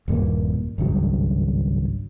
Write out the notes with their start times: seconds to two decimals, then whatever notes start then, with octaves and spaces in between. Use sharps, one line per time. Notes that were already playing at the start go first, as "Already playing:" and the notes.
0.08 D#1 G2 G#3 A#3
0.78 G#1 C#2 G2 F#3